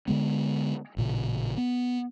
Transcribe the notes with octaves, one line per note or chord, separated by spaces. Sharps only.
D3 G#3 B3
A1 A#2 C#3
B3